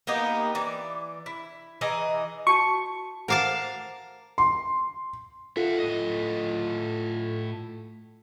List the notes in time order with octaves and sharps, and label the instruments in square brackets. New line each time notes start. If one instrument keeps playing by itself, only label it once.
[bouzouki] A#3 B3 D#4 G4
E3 D5
E4
E3 G#4 D#5 A#5
[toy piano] F#4 A5 [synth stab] C#6
[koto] A#4 F5 A5 [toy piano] C5 F#5 D6
[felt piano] C6
[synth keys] F4 A4 [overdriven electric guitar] E5 F#5
[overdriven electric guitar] A2 D#5